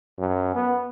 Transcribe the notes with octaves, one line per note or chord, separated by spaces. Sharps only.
F#2
B3